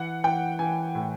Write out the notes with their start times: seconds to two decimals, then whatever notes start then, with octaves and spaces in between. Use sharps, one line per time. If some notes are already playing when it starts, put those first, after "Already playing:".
Already playing: E3 F#5
0.24 E3 G5
0.59 E3 G#5
0.95 A2